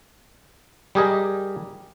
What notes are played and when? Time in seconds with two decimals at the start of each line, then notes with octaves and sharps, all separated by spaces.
0.95 G3 G4 G#4 A#4 D#5